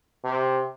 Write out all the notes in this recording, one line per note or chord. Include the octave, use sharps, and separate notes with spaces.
C3